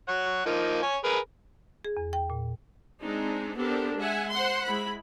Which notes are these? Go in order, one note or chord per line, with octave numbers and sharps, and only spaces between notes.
C#5 F#5
F3 A#3 D#4
C#5 G#5
G#4 A#4 B4
G#4
E2
G5
A#2
G#3 C4 D4 D#4
B3 C4 D4 G4 A4 A#4
G#3 E5 F#5 G#5
C5 F#5 C6
G#3 E4 B5